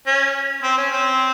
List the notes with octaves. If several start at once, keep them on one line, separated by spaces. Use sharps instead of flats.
C#4
C4
C#4
C4